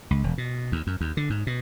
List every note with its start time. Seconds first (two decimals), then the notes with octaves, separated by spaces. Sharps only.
0.11 C#2
0.24 E1
0.38 B2
0.72 D#2
0.87 F#2
1.01 D#2
1.17 D3
1.30 G#2
1.47 B2